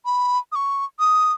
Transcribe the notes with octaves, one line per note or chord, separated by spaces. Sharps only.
B5
D#6
C#6
D#6